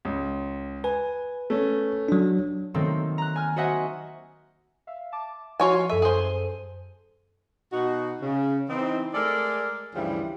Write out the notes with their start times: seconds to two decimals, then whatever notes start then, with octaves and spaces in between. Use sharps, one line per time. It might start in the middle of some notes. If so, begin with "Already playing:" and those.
0.05 C#2
0.84 B4 G#5
1.50 A3 C#4
2.09 F#3 D4
2.74 D#3 F#3 A3 A#3 C4
3.18 A#5 F#6
3.36 G#5 F6
3.56 F#4 C5 D#5 E5 F#5 G#5
4.87 E5 F5
5.12 A5 D6
5.60 F3 F4 F#4 C#5 G#5
5.90 F#2 A4 E5 D#7
6.02 G#4 C5
7.73 B2 D#4 F#4
8.22 C#3
8.70 E3 C4 D#4
9.14 G#3 A3 A4 A#4 D5
9.95 D2 G2 C#3 E3 F3 G3